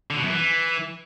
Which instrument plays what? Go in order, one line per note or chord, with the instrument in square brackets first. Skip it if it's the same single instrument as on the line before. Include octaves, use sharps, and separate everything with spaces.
[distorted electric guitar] D3
B2
F#2
E3